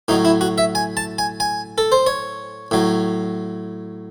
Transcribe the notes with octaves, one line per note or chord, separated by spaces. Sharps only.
A2 F#3 D#4
E4
F#4
E5
G#5
A5
G#5
G#5
A4
C5
C#5
A2 F#3